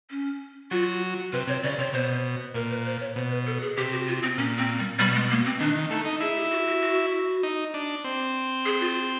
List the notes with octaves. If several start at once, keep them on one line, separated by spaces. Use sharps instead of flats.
C#4
F#3 F4
C3 B4
C3 C#5
C#3 D5
C3 C#5
B2 C5
A#2 A#4
B4
C5
C#5
B2 C5
B4
A4
G#4
C3 G4
F#4
F4
C4
A#2 C#4
C4
G3
B2 G3
G#3
A#3
C4
D#3 D4
D#3
A3 D#4
D#4
E4 G#4
G4
F#4
F#4
F#4
D#4
D4
C4
G#4
F4